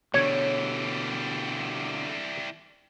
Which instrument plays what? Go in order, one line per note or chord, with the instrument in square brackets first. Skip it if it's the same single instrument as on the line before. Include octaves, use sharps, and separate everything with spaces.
[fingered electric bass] B2 D3 [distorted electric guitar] E3 G3 [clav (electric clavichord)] C#5